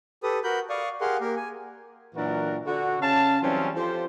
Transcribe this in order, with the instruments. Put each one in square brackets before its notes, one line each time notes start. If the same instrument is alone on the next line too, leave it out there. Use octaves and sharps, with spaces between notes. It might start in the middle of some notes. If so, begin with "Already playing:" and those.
[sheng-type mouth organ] G4 A4 B4 D#6
F#4 A#4 B5 G6
D5 F5 C#6 D#6
G4 G#4 A#4 F5 F#5 C6
A#3 G4 A#4
G#5
[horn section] A#2 E3 F#3 D4 F#4 A#4
D3 F#4
C#3 C#4 F5 A5
E3 F#3 G3 C4 C#4 F4
F3 F4 G4 A4 C5